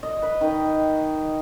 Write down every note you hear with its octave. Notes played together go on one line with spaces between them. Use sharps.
D#5
B4
D#3